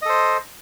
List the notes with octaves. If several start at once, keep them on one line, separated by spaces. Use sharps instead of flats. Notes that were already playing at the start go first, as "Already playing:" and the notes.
A4 C5 D#5